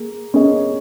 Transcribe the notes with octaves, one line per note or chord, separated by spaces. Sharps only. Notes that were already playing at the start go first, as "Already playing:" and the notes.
Already playing: A#3 G#4
A#3 C#4 G#4 D#5